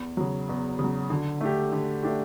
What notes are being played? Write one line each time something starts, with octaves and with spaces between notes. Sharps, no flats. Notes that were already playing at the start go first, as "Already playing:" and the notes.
Already playing: E2
C#3 F#3
E2
C#3
F#3
D3
A3 D4 G4
D3
A3 D4 G4